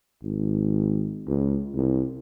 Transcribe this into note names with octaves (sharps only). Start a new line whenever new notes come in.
G#1
C#2
C2